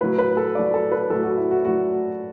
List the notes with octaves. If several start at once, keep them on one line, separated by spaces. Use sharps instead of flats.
A2 F#3 B4
B4
A4
A2 F#3 D5
A4
B4
A2 F#3 A4
F#4
E4
F#4
A2 F#3 F#4